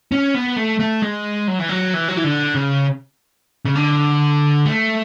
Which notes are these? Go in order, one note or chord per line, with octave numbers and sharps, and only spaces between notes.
C#4
B3
A3
A3
G#3
F#3
E3
F#3
E3
F#3
E3
D3
C#3
C#3
D3
A3